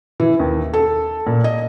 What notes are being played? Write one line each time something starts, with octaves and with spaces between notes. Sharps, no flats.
E3
D#2
A4
A#2
D#5